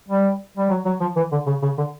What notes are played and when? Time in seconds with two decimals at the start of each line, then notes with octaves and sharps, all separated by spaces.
0.08 G3
0.57 G3
0.70 F#3
0.85 F#3
1.00 F3
1.16 E3
1.32 D3
1.46 C#3
1.62 C#3
1.78 D3